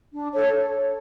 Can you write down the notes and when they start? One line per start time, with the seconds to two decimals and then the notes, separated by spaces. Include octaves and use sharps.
0.12 D4
0.32 A4 C#5